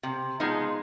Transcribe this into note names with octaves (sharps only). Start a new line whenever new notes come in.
C3
F3 G#3 B3 D#4